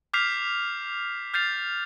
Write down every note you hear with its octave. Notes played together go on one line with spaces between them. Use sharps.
D6 F6 G6 B6 C7 F7
F6 G6 A6 C7 F7